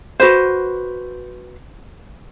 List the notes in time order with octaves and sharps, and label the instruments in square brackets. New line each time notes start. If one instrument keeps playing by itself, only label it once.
[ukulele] F#4 B4 C5